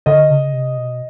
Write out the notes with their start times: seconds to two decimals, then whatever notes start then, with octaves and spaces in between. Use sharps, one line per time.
0.06 D3 D#5
0.30 C#3
0.53 C3
0.77 B2